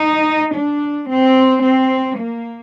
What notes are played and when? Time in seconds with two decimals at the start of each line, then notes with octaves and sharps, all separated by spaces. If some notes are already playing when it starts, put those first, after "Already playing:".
Already playing: D#4
0.55 D4
1.10 C4
1.64 C4
2.18 A#3